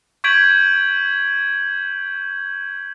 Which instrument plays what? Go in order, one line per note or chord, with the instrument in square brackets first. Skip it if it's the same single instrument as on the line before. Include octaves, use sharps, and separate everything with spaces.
[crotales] C#6 G6 G#6 B6 D7 F#7